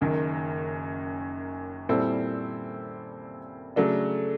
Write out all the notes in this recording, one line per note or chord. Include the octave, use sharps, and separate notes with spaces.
F#1 F#2 D#3
A#2 G3 C4 E4 A4
C#3 F#3 A3 D4